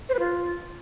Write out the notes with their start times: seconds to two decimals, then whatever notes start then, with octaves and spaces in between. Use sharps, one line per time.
0.09 C5
0.14 B4
0.19 F4